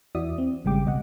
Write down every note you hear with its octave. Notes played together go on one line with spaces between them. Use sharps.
E2 E3 F#4 D5 E5 D#6
C4
G#1 C#3 G3 G#3 G5 D6
C#2 B2 D#5 F#5